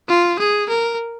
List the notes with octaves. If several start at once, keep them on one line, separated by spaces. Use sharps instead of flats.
F4
G#4
A#4